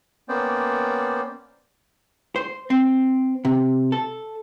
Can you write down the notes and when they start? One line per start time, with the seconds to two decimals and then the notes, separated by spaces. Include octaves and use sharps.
0.29 A#3 B3 C#4 C5 D5 G5
2.36 C5
2.70 C4
3.45 C3
3.92 A4